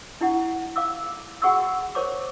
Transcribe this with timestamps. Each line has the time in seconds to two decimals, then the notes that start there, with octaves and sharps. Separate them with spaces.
0.21 D4 E4 G4 F#5
0.76 F5 D6 E6
1.42 F#4 G#4 F#5 C#6 D#6 E6
1.95 A#4 C5 C#5 C#6 D6